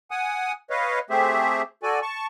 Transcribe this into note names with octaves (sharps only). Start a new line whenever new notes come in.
F#5 G#5 D#6
B4 C#5 D#5 F5
A3 C4 G4 G#4 C5 E5
F#4 A4 D5 G#5
A5 C#6